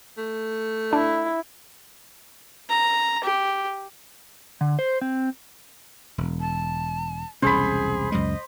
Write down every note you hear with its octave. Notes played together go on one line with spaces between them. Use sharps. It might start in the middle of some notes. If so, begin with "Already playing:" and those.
A3
D4 E4
A#5
G4
D3
C5
C4
E1
A5
E1 C2 C#4 G#4 C5 B5
C#2 F#2 G#3 D#5